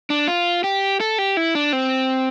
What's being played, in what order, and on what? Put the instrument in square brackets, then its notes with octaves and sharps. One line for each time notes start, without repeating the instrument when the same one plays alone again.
[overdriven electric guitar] D4
F4
G4
A4
G4
E4
D4
C4